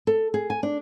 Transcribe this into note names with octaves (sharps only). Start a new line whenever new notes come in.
A4
G#4
G#5
D4